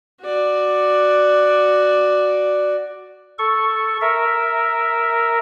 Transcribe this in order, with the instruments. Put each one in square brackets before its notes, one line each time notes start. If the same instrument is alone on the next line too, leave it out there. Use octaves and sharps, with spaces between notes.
[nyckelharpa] F#4 D5
[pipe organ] A4 C#6
A#4 E5